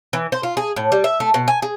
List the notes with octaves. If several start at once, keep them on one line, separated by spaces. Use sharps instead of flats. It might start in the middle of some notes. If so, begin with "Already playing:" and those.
E3
C5
F4
G#4
A2
G3
E5
A3
B2
G#5
G#4